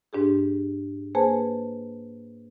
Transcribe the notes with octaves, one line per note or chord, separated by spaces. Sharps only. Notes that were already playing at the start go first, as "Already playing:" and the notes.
G#2 D4 G4 G#4
A#3 G#4 B4 C5 G#5 A5